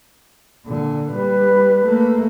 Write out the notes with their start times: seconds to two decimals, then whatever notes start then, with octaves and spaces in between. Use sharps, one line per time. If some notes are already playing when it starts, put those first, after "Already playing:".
0.66 A#2 D3
1.12 G3 B4
1.83 A3 A#3